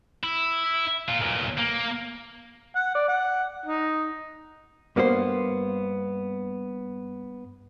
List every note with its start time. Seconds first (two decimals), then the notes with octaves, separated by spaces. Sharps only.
0.24 E4
1.08 A#2 F4
1.21 B1 A#2
1.59 A#3
2.76 F#5
2.95 D5
3.08 F#5
3.66 D#4
4.96 G2 A#3 B3 A4 C5